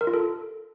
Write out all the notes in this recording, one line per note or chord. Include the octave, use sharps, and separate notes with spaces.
A#4
F4
A4